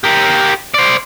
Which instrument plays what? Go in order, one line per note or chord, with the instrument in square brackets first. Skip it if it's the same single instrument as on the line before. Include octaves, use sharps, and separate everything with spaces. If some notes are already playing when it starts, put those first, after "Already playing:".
[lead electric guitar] G4 A#4
C5 D5